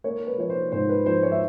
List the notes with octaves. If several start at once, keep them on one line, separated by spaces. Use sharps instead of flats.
A#3 C#5
B4
F3 C#5
C5
G#2 C5
B4
F3 C5
C#5
E5